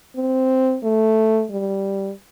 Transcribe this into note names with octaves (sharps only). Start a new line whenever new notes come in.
C4
A3
G3